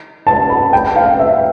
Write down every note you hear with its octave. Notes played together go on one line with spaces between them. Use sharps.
A5
B5
G5
F5
E5